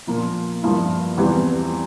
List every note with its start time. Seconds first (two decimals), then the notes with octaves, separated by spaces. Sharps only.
0.07 A#2 F3 A#3 F4
0.62 G2 F3 A#3 E4
1.18 E2 E3 G3 C4 G4